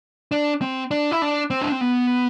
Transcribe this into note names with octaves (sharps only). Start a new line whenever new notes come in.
D4
C4
D4
E4
D4
C4
D4
C4
B3